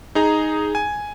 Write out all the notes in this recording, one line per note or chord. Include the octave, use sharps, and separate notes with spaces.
D#4 G#4 A#5
G#5